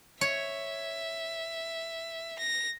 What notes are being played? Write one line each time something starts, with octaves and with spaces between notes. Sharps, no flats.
C#5 E5
A#6